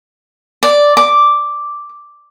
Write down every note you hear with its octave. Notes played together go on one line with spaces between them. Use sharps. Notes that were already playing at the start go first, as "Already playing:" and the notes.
D5
D6